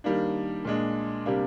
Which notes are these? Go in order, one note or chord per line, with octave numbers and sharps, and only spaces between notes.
D#3 G3 A#3 D4
A#2 G#3 D4
C3 G3 A#3 D4